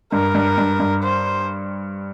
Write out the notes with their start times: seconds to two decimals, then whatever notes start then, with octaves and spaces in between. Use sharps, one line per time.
0.12 G2 A#4
0.35 G2
0.58 G2
0.80 G2
1.03 C5